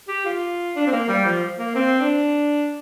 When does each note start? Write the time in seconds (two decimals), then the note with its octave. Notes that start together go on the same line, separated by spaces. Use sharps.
0.08 G4
0.25 F4
0.76 D4
0.87 C4
0.92 A#3
1.09 G3
1.25 F3
1.58 A#3
1.75 C4
2.00 D4